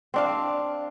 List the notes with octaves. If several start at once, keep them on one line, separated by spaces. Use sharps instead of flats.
C4 D4 F5